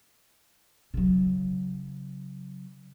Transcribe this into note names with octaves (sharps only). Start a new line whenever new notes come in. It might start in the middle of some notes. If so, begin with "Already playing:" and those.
C#3 F#3